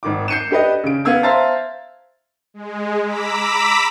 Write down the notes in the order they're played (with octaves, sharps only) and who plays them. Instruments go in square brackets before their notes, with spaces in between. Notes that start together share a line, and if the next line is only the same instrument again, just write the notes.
[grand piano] G#1 D#3 D6
G6 C7 C#7 D#7 E7
D4 G4 B4 D#5
C#3 D7
B3 F5 E6 G#6
C5 E5 F5 A5 A#5 A6
[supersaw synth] G#3
A#5 B5 D6 E6 B6